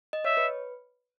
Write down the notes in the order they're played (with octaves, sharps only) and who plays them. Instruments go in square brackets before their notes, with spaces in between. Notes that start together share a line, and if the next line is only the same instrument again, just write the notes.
[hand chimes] D#5
[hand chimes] C#5 [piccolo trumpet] E5
[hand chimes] B4